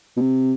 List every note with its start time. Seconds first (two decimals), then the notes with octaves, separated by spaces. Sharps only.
0.17 B2
0.21 C3